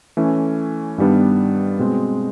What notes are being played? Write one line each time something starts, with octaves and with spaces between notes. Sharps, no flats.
E3 A3 C#4
G2 D#3 G3 B3 D4
B2 G#3 C4